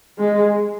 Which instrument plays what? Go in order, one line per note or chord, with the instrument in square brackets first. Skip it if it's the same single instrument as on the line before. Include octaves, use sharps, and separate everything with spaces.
[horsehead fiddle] G#3